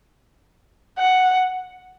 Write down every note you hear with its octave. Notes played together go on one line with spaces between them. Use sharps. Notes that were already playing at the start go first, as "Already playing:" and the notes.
F#5